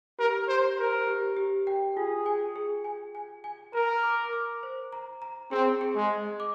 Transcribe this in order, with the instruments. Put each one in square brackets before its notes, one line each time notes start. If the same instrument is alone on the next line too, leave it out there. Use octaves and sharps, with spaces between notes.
[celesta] G4 [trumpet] A#4
[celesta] G4 [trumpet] C5
[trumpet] A#4 [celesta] C5
[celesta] G4
G4
G5
[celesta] F4 [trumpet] G#4
[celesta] G#5
G#4
G#5
G#5
G#5
[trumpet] A#4 [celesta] A#5
[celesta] D6
D6
C5
A#5
A#5
[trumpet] C4 [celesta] G#4
[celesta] G#4
[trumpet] G#3
[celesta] D#5
D6